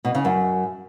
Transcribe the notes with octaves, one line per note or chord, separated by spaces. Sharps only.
B2
C#3
F#2